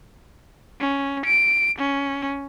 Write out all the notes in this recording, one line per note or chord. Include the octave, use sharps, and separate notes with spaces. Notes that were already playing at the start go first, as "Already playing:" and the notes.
C#4
D7
C#4